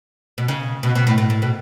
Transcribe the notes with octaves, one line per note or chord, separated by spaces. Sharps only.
B2
C#3
B2
B2
A2
A2
A2
B2